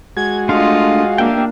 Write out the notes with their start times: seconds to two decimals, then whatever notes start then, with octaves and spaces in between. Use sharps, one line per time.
0.17 G#3 F#4 G#6
0.49 A3 D4 F4 D#5 F5 C6
1.18 A#3 D4 G4 E5 G5